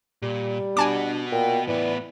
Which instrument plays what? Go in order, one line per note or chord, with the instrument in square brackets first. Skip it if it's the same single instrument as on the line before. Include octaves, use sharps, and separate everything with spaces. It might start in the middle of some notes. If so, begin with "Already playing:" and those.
[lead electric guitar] A#2 [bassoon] G3
[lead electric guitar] B3 F#4 [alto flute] D4 [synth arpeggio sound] G#5 A5 D6
[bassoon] A#2 [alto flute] G5
[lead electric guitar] A2 B3 [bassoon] E3 [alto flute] D5